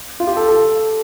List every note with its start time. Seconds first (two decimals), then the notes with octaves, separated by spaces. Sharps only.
0.20 F4
0.27 G4
0.37 A4
0.48 A4